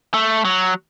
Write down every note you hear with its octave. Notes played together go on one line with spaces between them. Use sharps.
A3
F#3